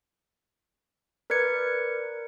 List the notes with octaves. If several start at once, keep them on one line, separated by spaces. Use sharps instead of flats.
A#4 B4 D5 G#6 C#7